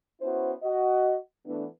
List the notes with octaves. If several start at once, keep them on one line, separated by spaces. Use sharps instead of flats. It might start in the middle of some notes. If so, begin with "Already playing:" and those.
B3 C#4 E4 F#4 C5
F#4 D#5
E3 A3 B3 D4